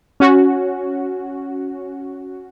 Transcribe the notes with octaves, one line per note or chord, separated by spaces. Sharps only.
C#4 F#4